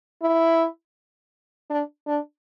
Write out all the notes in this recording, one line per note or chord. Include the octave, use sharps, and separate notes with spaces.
E4
D4
D4